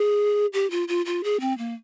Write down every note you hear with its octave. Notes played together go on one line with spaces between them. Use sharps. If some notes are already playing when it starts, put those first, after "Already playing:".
Already playing: G#4
G4
F4
F4
F4
G#4
C4
A#3